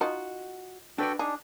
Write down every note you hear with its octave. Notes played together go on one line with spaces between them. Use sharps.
D#4 F4 F#4 D#5
D4 F#4 A4 B4 D5 G5
D4 D#4 G#4